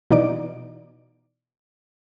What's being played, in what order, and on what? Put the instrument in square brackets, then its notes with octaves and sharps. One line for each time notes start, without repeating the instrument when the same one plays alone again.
[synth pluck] B2 E3 D#4 D5 D7